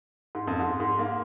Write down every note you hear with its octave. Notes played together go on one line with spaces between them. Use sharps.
G#2
F2
G#2
G#2
A#3